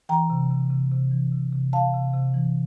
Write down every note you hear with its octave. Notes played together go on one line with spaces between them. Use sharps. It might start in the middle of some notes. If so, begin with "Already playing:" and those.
E3 G5 A#5
C3
C3
C3
C3
E3
C3
C3
C3 F5 A5
C3
C3
E3